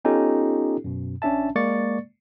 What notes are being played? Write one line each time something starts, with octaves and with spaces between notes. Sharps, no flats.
B3 C#4 D#4 F4 G4 A4
F#2 B2
A1 C#4 D4 E5 A5
G#3 A#3 D5 C#6 A6 C#7